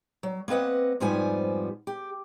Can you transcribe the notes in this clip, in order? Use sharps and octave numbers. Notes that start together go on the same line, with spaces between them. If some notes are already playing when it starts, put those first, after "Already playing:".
F#3
A#3 C4 B4 D#5 F#5
F2 G#2 F3 G3 B3 G#5
G4